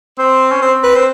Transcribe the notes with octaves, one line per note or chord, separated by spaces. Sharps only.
C4 C5
C#4
C4 C5
B4
C4 C5